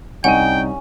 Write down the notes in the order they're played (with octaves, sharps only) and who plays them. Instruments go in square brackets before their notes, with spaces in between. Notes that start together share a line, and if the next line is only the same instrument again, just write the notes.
[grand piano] C2 D#4 D#7 [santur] C#4 [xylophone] F#5 [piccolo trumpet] G5